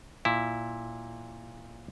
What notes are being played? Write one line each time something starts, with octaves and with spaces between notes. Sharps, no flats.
A#2 E4